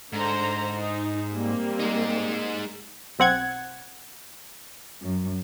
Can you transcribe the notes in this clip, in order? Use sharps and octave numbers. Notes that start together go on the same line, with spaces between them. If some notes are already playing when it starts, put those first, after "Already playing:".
G#2 D3 C5 A#5
D#4
G3 A#3 C4
G#3 D#4
B1 C4 F#5 G#6
F#2